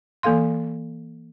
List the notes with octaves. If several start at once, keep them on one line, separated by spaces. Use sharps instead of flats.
E3 A#3 A4 F5 C6